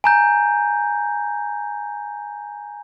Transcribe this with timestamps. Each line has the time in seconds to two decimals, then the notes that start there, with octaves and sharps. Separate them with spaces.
0.04 G#5 A#5 G6